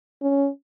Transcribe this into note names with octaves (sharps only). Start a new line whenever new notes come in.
C#4